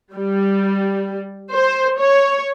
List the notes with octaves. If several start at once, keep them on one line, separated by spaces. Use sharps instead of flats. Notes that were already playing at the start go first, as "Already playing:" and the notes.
G3
C5
C#5